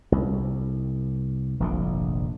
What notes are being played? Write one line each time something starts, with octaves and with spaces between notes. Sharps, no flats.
C2
F1 A#1 D3